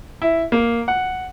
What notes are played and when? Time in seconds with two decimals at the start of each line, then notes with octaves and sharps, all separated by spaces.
0.22 E4
0.52 A#3
0.88 F#5